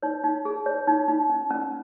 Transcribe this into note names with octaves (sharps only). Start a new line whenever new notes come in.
D#4 C#5
D#4
G#4
C#5
D#4
D#4
C#4
C#4